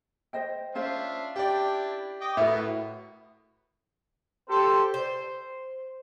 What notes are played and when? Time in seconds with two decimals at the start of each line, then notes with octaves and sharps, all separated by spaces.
0.33 C5 D#5 G5
0.75 C#4 D4 F4 C5 E5 F5
1.36 D4 E4 G4 D5 G5
2.21 D#5 G5 D6
2.37 A2 B3 E4 F#4 A#4 E5
4.49 G4 A4 C5
4.94 C5